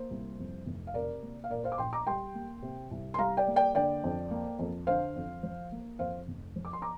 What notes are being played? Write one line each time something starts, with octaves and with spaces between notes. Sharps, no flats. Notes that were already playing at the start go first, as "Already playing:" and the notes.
Already playing: A#3 C5
C2
F2
F1
F5
C3 A#4 D5
A#3
F5
A#2 A#4 D5
C5 F5
D6
A#1 G5 C6
A#5 D6
G3 G5 C6
A#3
C3
C2
C6
G3 F5 A#5
D5 G5
A#3
D5 G5
D3 D5 G5
F2
A#3
F2
D3 C5 F5
F2
F3
A#3
F2 C5 F5
F1
F3
D6
C6
A#5 D6